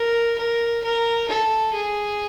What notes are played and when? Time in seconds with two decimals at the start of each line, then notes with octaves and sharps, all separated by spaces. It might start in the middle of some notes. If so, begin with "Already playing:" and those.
Already playing: A#4
0.38 A#4
0.83 A#4
1.28 A4
1.74 G#4